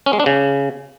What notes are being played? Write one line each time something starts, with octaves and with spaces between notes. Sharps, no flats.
C#4
G#3
D4
C#3